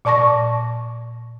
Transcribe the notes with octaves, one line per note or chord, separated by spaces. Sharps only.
A#2 D5 A5 C#6 A#6